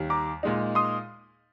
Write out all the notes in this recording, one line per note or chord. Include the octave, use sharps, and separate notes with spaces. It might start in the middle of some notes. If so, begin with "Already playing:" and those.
Already playing: D#2 D#3 G3
A#5 D6
A#2 G#3 D#4
C6 D#6